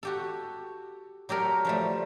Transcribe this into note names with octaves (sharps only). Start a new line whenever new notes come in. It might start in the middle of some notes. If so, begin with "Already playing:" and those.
F#4 G4 A4
F#3 G4 A4 A#4
F3 G3 A3